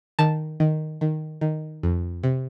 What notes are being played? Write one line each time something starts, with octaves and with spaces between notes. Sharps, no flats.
D#3 A5
D#3
D#3
D#3
F2
C3